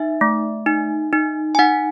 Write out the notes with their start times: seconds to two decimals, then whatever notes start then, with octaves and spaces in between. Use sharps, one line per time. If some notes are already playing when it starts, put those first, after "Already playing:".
Already playing: D#4 E5
0.21 A3
0.66 D#4
1.13 D#4
1.55 G#5
1.59 D#4 F#5